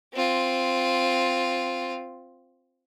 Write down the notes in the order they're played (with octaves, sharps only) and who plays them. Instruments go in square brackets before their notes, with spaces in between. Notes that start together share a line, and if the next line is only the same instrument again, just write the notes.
[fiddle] C4 F4